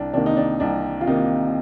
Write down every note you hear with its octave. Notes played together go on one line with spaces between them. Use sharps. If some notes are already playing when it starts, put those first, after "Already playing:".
Already playing: C2 D4
C3 D#3 A#3 D4
D#4
D4
C2 D4
F4
C3 D#3 A#3 D#4